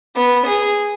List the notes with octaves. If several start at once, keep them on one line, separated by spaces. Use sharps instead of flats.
B3
G#4